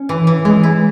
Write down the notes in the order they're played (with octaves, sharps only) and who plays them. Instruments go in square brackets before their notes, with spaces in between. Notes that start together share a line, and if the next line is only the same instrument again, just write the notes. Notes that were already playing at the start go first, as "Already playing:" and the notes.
Already playing: [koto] C#4
E3
E3
[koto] E3 [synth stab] G#3
[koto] E4